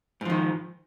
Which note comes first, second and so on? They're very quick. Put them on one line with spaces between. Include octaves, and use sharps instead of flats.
G#2 F3 D#3